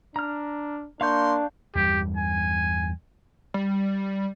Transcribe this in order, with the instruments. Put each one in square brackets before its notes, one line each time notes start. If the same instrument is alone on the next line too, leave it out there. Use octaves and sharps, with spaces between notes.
[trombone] D4 [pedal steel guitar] A#5 F6
[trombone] A#3 [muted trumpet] D4 [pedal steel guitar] F5 C#6 G6 [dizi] C6
[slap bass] E2 G2 G3 [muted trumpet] G4
[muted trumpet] G#5
[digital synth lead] G3